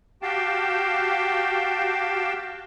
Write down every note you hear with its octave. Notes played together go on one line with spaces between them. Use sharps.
F#4 G4 F5 G5 A5